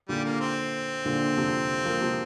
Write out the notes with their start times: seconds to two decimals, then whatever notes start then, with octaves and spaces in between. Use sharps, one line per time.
0.09 A#2 D3 G3
0.24 A#3
0.40 C4
1.05 A#2 D3
1.37 C3 F3
1.85 F3 A#3
2.01 C3 F3